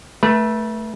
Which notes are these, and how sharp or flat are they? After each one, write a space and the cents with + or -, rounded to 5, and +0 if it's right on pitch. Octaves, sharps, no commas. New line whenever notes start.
A3 +0 B4 -35